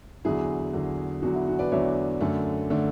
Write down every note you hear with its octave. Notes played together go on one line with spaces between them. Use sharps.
E2 D3 F#3 E4 G#4
E2 D3 F#3
E2 D3 F#3 F#4
E4
F#4
B4 D5
E2 D3 F#3 C#5 E5
F#2 D3 A3 D4
D3 A3 D4